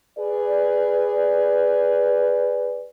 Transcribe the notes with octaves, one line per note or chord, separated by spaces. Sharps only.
G#4 B4 D5